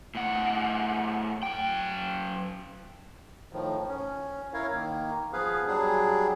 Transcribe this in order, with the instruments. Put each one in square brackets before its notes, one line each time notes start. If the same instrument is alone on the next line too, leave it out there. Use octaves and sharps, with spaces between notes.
[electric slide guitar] A2 F#5
F#2 G5
[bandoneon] A2 D#3 F3
C#4
E4 A#4 C#5 F5
D#3 A#3
F3 B3 G#4 B4 F5
F#3 G3 D4 G#4